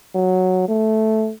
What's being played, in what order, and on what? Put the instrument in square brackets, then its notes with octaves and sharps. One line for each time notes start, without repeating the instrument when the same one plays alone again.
[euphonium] F#3
A3